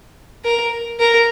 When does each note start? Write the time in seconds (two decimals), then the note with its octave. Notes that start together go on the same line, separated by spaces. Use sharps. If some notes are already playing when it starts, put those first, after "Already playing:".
0.44 A#4
1.00 A#4